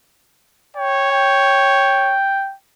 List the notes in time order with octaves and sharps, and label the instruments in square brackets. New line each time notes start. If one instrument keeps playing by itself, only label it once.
[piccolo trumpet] C#5 [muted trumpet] G5
[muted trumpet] G5